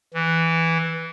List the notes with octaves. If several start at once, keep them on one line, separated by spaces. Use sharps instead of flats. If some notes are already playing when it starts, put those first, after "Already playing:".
E3